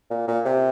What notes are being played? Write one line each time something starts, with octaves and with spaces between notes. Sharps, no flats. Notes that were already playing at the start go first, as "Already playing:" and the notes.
A#2
A#2
C3